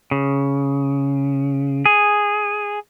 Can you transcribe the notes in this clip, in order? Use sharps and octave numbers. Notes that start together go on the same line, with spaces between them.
C#3
G#4